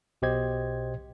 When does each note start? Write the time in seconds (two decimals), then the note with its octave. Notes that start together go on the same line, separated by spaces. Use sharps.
0.22 B1 B2 G4 C5 D#5 G#6